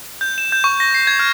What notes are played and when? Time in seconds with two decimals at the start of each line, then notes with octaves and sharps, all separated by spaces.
0.21 G6
0.38 E7
0.52 G6
0.64 C#6
0.80 A#6
0.94 C7
1.07 G#6
1.19 F6